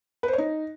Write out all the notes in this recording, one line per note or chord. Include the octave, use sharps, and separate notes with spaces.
B4
C5
C#5
D#4